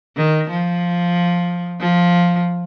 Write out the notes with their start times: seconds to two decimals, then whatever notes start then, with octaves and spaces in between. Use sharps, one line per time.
0.17 D#3
0.50 F3
1.80 F3